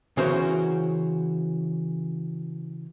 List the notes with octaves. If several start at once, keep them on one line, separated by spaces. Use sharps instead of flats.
C#3 E3 C#4 F#4 A#4 C5